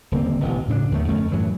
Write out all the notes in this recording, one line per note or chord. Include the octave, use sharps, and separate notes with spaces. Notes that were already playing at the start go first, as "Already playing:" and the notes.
D#1 D3 A#3 C4
A1 B2
A2 C#3 C4 D4
D#2 D3 D#3 A3
F2 A3 C#4
F#2 A2 E3 F#3